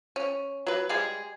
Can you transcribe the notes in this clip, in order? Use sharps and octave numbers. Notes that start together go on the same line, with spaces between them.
C#4
F#3 B4
G3 G#3 G#4